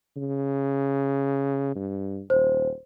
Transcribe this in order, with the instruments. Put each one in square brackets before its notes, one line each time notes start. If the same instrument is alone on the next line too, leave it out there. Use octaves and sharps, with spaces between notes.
[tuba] C#3
G2
[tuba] D#1 [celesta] C5